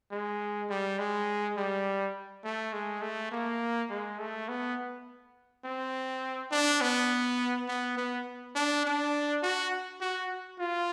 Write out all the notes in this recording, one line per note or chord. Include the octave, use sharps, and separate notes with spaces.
G#3
G3
G#3
G3
A3
G#3
A3
A#3
G#3
A3
B3
C4
D4
B3
B3
B3
D4
D4
F#4
F#4
F4